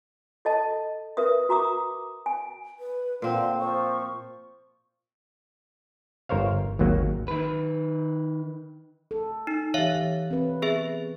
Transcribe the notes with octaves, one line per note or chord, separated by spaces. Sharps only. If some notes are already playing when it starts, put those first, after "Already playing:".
A4 D#5 A5
A#4 B4 E5 D#6
F#4 A#5 D6 D#6
G#5
B4
A#2 D3 C4 F5 C6
F3 C5 C#6
G1 A#4 C5 C#5 F5
G#1 D#2 F#3 A#3
D#3 B4
A4
D#4
E3 G4 C#5 E5 F5
E3
C4 B4
B3 G#4 E5